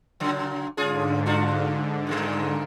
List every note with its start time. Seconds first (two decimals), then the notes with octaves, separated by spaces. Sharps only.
0.20 A#2 C#3 F#3
0.77 G#2 D3 C#4 F4 G#4
1.26 D4 F4 F#4
2.07 A#2 D#3 G3